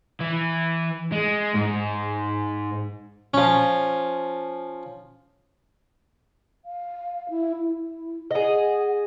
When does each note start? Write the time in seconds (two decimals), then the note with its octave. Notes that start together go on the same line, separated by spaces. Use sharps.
0.20 E3
1.12 G#3
1.54 G#2
3.34 F3 C#4
6.65 F5
7.30 E4
7.60 E4
8.31 G#4 D#5 F#5